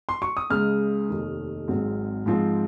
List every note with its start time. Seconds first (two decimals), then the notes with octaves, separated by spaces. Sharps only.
0.09 C6
0.22 C#6
0.37 D#6
0.50 C#2 C#3 G#3 F6
1.09 F1 D#2 D#3
1.68 G#1 G#2 F#3 C4
2.26 G#2 F3 C4 F4